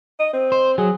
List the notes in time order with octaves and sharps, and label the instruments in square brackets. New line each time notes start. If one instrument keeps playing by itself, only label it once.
[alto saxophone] D#5
C4
[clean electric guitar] C5
[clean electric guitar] F#3 [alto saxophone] G#4